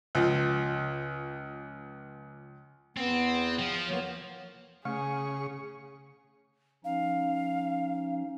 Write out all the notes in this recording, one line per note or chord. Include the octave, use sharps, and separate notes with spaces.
C#2 F3
E2 B3 C4
F3
A#3 B3 C#5
C#3 A3 G#4 C#6
F3 C#4 D#4 F5